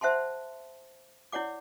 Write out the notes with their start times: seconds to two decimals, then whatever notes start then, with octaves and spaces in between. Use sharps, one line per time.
0.01 C5 E5 F#5 A5 C6
1.32 E4 C#5 D5 F#5 D6